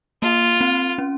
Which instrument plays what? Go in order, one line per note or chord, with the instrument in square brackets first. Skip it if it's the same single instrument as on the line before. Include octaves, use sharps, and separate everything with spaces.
[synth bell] A#3 [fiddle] F4
[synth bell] C4
C#4